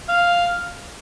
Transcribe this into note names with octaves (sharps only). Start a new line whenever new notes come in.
F5